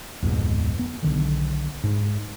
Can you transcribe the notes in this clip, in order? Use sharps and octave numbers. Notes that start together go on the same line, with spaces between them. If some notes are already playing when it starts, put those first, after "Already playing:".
D1 F2 G#2 B2
B3
B1 D3 D#3
G#2